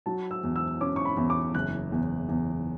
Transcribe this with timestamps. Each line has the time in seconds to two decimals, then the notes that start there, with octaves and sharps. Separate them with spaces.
0.06 F#3 A5
0.31 E6
0.44 E2
0.56 E6
0.81 C#4 D6
0.96 C#6
1.05 B5
1.17 E2
1.30 D6
1.55 F#1 F#6
1.92 E2
2.29 E2